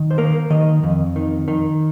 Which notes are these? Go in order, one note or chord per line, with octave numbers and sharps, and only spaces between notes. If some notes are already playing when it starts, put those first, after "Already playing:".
Already playing: D#3
C5
A#3 A#4
D#3 D#5
F2
D#3
D#3